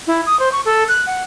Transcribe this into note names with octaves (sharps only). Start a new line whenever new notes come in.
E4
D#6
C5
C#6
A4
F#6
F#5